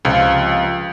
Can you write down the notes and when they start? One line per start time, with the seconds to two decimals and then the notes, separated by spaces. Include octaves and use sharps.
0.05 C#2 C3 F3